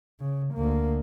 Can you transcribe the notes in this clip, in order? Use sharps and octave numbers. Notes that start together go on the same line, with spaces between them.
C#3
D2 A#3